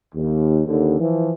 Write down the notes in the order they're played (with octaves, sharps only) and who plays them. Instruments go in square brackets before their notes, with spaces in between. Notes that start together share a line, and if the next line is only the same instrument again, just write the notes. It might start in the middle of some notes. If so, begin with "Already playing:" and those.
[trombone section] D#2
D#2 D3
E3 F3